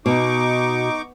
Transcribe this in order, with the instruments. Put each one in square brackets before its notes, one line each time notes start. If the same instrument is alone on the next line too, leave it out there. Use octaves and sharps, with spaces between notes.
[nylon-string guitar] B2 [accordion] D#4 C#6 D6